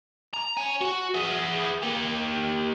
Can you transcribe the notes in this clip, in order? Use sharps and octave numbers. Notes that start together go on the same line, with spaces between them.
A#5
C#5 G#5
F#4
B3 G#4
A#3 G4